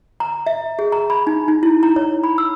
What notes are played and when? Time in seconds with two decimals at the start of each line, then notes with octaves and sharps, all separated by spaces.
0.20 A#5
0.46 E5
0.79 G#4
0.92 A#5
1.10 B5
1.27 D#4
1.48 D#4
1.63 E4
1.83 A#5
1.96 C#5
2.24 B5
2.38 E6